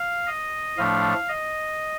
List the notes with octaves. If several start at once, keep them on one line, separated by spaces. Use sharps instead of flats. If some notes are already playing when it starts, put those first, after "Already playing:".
Already playing: F5
D#5
A2 F3 A3 D4 F5
D#5